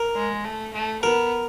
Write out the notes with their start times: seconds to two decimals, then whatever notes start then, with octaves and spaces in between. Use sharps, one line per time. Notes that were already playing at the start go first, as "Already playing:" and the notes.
Already playing: A#4
0.15 G#3
0.45 A3
0.73 A3
1.02 B3 A#4